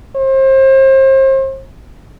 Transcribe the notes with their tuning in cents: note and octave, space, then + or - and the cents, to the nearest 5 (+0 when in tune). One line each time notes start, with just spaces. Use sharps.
C5 +35